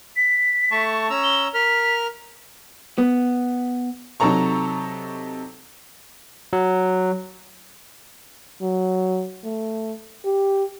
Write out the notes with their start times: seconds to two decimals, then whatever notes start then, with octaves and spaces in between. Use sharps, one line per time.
0.16 B6
0.71 A3 A5 C#6
1.10 C#4 A#5 E6
1.24 G7
1.54 A#4 F6 B6
2.98 B3
4.20 C3 F#3 D#4 A4 A#5 C#6
6.53 F#3
8.62 F#3
9.44 A3
10.25 G4